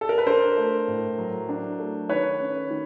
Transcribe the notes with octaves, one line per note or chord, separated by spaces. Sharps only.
A4
A#4
B4
D4 A#4 C5
A3
A2
F#3
D4
A3
D#3 B4 C#5
C#4
D#3